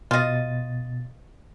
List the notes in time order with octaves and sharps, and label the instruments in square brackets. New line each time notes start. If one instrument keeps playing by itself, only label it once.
[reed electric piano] B2 A6 [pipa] F4 D#5